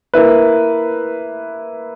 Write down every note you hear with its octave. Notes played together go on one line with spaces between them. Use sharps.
A#3 E4 B4